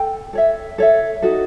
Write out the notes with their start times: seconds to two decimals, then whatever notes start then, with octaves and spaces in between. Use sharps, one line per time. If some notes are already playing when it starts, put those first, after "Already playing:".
Already playing: A4 G5
0.33 A4 C#5 E5
0.78 A4 C#5 E5
1.22 D#4 F#4 A4